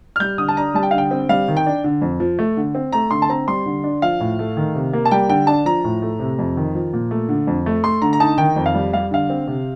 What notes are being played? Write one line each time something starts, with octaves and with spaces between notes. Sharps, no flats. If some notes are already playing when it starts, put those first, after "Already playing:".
F6
G3 G6
D3 D#6
A5
D4 A#5
G3 A5
G5
D3 F5
G5
C4
G3 F5
D#3
G5
D4
D3
F2
F3
A3
D3
C4
A3 A#5
D3 C6
A5
C4 A#5
G3 C6
D3
D4
F3 F5
A2
A3
D#3
C3
A#3
A5
G3 G5
D3 G5
D4 A5
F3 A#5
A2
A3
C3
F2
D#3
F3
A#2
A3
D3
F2
A3
A3 C6
D3 A#5
A#5
D#4 A5
D#3 G5
F2
F5
G3
G3 F5
D3 F5
C4
C3